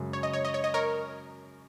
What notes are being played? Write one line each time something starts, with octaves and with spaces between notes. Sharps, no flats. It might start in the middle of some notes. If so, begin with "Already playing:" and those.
Already playing: F#2 C#3 G#3
C#5
D#5
C#5
D#5
C#5
D#5
A#4 C#5